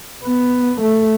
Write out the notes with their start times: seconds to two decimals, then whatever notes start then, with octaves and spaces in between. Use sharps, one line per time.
0.24 B3
0.81 A3